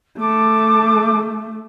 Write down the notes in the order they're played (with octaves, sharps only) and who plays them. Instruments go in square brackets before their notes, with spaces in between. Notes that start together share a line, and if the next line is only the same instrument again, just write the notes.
[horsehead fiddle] A3 [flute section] A4 D6